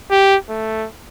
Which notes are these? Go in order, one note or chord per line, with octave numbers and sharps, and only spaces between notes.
G4
A3